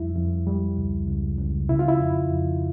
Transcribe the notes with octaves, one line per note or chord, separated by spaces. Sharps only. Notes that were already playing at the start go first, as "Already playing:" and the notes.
Already playing: F2 G3 E4
F2
G3
C#2
C#2
C#2
C#3 E4
F4
E4
F2
F2